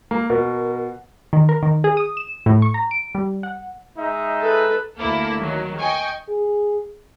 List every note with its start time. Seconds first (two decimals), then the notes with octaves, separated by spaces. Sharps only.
0.11 A#3
0.30 B2 A#4
1.33 D#3
1.49 A#4
1.63 D#3
1.84 G#4
1.97 D#6
2.17 E7
2.46 A2
2.62 C#6
2.74 A#5
2.91 D7
3.15 G3
3.43 F#5
3.98 G#3 D#4 E5
4.41 A4 B4
4.98 D2 A3 A#3 E4 A4
5.38 D#3 F#3
5.78 D#5 G5 G#5 C#6
6.29 G#4